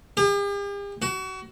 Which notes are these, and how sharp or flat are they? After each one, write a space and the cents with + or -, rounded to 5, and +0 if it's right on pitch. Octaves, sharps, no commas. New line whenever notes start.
G4 +45
F#4 +30